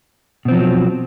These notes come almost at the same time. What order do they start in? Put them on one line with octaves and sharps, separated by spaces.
B2 C4 F3 F#3